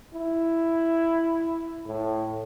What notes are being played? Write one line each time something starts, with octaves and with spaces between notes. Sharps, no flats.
E4
A2